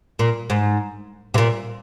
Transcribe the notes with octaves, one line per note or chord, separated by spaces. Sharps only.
A#2
G#2
C3
A#2